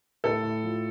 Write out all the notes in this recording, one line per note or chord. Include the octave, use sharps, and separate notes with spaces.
A2 A4
A2
F3